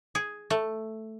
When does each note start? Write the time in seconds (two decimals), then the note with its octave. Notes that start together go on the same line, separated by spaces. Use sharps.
0.15 G#4
0.50 A3